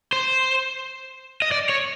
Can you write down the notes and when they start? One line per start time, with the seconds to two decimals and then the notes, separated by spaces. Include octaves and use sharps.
0.13 C5
1.42 D#5
1.52 D5
1.69 C#5